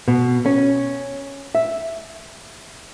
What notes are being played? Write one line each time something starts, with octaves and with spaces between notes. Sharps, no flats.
B2
C#4
E5